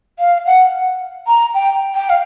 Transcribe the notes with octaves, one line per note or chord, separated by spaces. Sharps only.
F5
F#5
A#5
G5
G5
F5